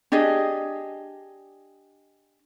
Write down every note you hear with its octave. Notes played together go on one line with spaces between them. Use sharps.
D4 G4 G#4 D#5